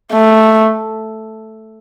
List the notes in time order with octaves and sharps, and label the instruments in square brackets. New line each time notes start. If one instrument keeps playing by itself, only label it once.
[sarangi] A3